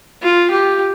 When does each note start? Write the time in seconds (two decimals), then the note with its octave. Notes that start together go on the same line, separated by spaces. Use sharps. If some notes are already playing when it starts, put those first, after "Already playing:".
0.22 F4
0.51 G4